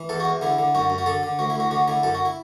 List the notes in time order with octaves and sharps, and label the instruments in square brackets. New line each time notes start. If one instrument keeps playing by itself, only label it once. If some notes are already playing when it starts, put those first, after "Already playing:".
Already playing: [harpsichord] E3
E2 A4
F#4
E2
D3 E4
D3
F#2 F#4
F#2
F#4
D3 A4
D3
D2 F#4
E4
D2 F#4
D3 F#4
D3 E4
F#2 A4
F#4
E4